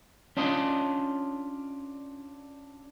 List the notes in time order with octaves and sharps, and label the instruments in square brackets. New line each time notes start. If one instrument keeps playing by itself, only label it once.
[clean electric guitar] C#4 D4 F4 D#5